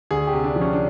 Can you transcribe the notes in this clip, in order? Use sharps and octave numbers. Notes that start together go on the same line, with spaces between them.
D2 G#4
G4
C3
D4
F3
C#4
D4